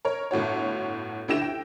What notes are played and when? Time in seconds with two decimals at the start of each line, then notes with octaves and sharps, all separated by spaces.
0.05 A#4 C#5
0.31 G1 A2 F#4 C#5
1.28 D2 D3 E4 G4 A#6 E7
1.42 G5